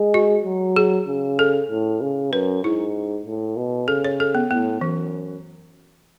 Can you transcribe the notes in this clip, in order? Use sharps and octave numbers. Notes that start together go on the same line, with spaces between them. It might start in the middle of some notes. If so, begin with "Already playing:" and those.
Already playing: G#3
F#4
F#3
G#4
C#3
A4
A2
C#3
F#2 B4
G#2 E4
A2
B2
C#3 A4
C#5
A4
B3
A2 B3
F#2 E3